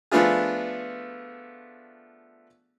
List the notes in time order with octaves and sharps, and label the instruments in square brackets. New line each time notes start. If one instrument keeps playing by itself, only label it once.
[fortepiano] F3 A3 B3 D4 F4 G#4